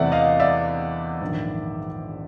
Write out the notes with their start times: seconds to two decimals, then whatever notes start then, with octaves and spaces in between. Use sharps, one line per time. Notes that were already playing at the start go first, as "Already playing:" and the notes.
Already playing: E2 C3 E3 A3 D5 E5 F#5
0.12 D#5 F5
0.40 D5 E5
1.21 A#1 G#2 D#3